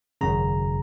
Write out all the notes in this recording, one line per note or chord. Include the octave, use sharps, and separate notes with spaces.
G#1 F#2 C#3 A#5